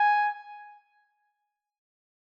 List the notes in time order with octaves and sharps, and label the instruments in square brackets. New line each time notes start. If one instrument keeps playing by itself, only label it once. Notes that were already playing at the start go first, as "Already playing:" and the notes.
Already playing: [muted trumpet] G#5